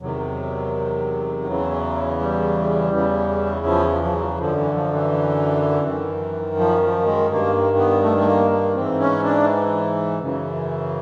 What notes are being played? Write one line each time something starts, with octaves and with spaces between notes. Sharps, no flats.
E2 C3 D#3 F#3
E2 C#3 E3
G3
E2 C#3 E3
F3
F3
F3
F#3
F#2 D3 F3
E3
F3
E3
F#2 D#3
F3
F3
G#3
G2 D#3 A#3
B3
A3
A3
A#3
A#3
G#2 E3 C4
C#4
D4
F#2 C#3 E3